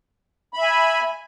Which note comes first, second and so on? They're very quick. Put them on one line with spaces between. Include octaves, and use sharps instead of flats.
B5 E5 G#5